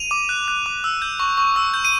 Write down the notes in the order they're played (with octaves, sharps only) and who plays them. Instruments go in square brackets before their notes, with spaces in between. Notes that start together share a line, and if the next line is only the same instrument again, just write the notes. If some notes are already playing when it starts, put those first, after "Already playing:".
Already playing: [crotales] D#7 F7
D6
F#6
F#6
D6
E6
G6
C#6
C#6
E6
G6
D#7